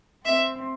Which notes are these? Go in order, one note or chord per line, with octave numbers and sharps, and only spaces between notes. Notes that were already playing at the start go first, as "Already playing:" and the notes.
C4 E5